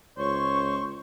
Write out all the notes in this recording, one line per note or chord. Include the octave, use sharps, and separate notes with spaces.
C#2 C5 C#5 C#6